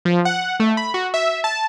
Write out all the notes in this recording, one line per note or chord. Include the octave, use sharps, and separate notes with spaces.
F3
F#5
A3
B5
F#4
E5
A5